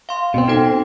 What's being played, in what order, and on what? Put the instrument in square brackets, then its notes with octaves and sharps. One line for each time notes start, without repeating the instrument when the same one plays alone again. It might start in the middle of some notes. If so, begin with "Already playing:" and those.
[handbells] F5 C6
[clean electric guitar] B2 C4
[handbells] D#4 A4 G5